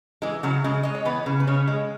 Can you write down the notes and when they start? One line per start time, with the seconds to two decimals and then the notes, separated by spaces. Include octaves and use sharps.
0.22 E3 G#3 G#4
0.43 C#3 F#3 F#4
0.64 C#3 G#3 G#4
0.83 G#3 D#5
0.95 C#5
1.05 E3 B3 B4
1.26 C#3
1.40 B4
1.47 C#3 C#4 C#5
1.68 G#3